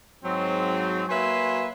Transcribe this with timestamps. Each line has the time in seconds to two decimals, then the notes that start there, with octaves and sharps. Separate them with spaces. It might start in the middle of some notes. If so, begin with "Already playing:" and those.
0.24 G#2 F#3 C4
1.09 F#3 A#3 B4 E5 G#5 C6